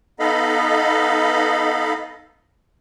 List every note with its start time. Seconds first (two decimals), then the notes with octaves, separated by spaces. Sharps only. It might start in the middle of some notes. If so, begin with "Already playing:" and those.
0.20 B3 D#4 A4 D#5 F5 B5